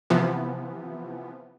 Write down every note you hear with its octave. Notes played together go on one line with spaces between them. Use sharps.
C3 E3 F3 B3